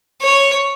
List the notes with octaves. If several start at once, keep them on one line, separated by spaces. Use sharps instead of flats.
C#5